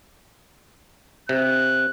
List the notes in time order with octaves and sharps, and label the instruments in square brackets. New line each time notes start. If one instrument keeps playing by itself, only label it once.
[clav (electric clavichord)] C3 [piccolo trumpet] F#6